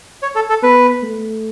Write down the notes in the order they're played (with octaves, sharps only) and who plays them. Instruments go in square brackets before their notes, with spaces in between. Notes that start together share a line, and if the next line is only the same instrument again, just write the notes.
[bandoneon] C#5
A4
A4
[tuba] B3 [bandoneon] B4
[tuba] A3